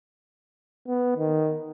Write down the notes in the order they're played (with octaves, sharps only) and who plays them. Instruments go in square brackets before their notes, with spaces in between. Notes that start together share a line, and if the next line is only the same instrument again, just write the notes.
[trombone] B3
D#3